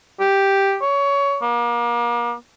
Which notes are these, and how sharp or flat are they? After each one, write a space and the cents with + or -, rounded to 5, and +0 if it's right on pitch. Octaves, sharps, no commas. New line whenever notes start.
G4 +0
C#5 +20
A#3 +35